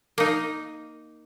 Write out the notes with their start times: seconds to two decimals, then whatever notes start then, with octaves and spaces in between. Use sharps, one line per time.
0.18 A#3 D#4